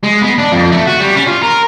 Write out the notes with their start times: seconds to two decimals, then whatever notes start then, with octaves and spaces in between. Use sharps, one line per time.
0.03 G#3
0.21 B3
0.38 D4
0.52 F2
0.72 A3
0.87 F#4
1.01 G3
1.16 C#4
1.27 F4
1.42 A#4